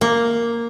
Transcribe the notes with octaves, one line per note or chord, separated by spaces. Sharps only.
A#3